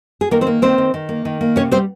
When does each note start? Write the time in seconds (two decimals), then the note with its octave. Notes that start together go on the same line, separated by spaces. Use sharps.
0.21 G#4
0.31 D#3 A#3 A#4
0.41 C4 C5
0.47 A#3
0.62 D#3 C4 C5
0.78 D#3
0.94 D#3
1.09 A#3
1.25 D#3
1.41 A#3
1.56 C3 C#4 C#5
1.71 G3 C4 C5